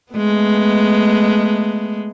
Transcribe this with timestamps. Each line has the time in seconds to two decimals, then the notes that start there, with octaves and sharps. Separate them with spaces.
0.13 G#3 A3 B3